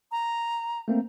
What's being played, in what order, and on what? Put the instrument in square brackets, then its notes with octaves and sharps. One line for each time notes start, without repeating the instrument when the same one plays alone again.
[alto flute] A#5
[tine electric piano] A3 A#3 C4